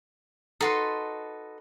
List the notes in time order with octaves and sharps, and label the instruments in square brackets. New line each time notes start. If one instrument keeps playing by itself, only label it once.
[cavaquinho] D#4 F#4 C6 [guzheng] A4 B4